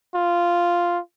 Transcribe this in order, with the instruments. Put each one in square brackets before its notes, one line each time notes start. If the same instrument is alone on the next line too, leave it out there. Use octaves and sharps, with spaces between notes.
[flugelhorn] F4